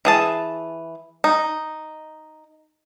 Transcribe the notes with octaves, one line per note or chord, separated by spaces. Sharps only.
E3 G#4 A5
D#4